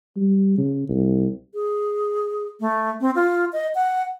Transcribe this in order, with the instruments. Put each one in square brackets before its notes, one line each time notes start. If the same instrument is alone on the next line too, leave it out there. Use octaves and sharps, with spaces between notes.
[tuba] G3
C#3
C2
[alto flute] G#4
A3
C4
F4
D#5
F#5